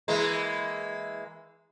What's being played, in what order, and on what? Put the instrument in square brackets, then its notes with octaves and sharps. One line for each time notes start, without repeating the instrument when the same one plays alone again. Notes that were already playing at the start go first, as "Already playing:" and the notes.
[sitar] E3 G#3 A#3